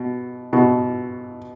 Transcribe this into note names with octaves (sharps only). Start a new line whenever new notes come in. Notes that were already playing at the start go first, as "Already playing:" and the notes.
Already playing: B2
B2